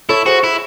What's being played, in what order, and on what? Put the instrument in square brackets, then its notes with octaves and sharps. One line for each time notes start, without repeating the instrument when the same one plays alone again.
[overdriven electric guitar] E4 [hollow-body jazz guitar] A4 C#5
[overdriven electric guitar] F#4 [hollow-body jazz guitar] G#4 C5
[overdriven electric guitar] E4